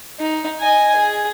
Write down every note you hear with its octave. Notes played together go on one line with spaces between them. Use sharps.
D#4
D#5 G#5
G#4